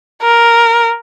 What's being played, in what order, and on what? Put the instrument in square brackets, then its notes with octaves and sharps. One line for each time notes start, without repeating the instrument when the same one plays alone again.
[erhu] A#4